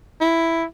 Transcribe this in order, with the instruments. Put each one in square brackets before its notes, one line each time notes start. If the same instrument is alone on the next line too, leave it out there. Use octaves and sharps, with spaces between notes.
[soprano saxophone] E4